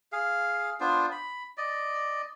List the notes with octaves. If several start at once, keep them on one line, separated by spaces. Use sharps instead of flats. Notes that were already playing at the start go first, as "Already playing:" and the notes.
G#4 F5
B3 D4 F4 C5
B5
D5 D#5